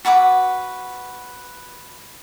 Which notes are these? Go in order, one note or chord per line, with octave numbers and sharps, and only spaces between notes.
F#4 B4 F#5 D6